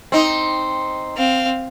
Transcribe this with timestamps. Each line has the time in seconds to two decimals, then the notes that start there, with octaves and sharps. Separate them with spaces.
0.12 C4 D#4
1.15 C4 F5